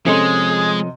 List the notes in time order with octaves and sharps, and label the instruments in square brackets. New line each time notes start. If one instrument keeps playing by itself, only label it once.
[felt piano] C3 D#5 C6 [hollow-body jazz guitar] F3 C#4 A4 [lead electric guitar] G#3 [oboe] G#4